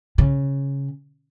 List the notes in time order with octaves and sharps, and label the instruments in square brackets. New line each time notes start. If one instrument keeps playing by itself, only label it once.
[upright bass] C#3